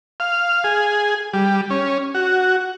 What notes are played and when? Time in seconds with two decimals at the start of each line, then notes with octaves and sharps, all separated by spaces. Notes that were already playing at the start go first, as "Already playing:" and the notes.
0.20 F5
0.64 G#4
1.33 G3
1.70 C#4
2.15 F#4